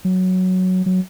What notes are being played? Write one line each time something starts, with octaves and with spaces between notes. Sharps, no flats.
F#3
F#3